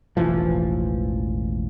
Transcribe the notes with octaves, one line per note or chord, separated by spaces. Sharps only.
E1 A1 E3 F3